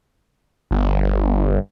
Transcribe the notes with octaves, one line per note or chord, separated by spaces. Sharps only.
G1